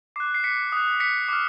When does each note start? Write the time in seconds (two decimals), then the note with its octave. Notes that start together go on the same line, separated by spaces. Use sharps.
0.16 D6 F#6 C7
0.34 C7
0.44 B6 C#7
0.72 D#6 F#6
1.00 B6 C#7
1.28 D6 F6